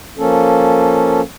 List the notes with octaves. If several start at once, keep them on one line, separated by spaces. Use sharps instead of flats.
F3 A#3 C#4 A4